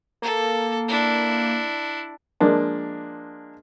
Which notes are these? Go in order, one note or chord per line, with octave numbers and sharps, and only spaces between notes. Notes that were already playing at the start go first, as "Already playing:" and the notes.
A#3 A4
D4 E4
F3 G#3 A#3 D4